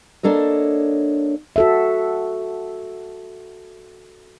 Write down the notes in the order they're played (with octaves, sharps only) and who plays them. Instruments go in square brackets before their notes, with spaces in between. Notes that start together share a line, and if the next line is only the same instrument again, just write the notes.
[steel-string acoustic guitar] A#3 D4 A4 C#5 D#5
[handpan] F#4 A4 E5